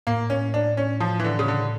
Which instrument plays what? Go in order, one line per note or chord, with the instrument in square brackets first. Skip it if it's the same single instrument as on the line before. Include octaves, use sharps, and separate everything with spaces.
[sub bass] A2 [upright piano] A#3
[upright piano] C#4
D4
C#4
F3
E3
D3
C#3
D3